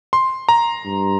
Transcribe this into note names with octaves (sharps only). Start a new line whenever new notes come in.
C6
A#5
G2